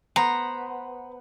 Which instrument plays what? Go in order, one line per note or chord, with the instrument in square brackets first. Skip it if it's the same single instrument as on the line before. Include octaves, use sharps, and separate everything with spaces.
[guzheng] B3 C5 [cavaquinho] A#5